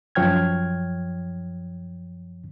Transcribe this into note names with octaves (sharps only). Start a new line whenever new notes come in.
F#2 F3 C#5 G5 F6 G#6